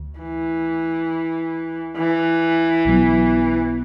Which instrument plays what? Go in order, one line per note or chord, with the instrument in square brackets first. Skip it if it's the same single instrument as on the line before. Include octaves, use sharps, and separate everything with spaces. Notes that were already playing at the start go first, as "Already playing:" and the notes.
Already playing: [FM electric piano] D2
[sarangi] E3
E3
[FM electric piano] B1 B2 F#3 B3